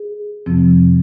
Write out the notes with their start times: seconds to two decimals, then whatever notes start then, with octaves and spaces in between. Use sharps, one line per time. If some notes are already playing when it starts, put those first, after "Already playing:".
Already playing: G#4
0.46 F2 C3 F3 C4